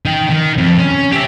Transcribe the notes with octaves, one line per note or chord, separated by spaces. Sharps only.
D#4 G5
D#3
F2
C#4
G4 E5